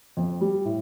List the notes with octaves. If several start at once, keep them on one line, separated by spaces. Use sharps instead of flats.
F2
G3
A2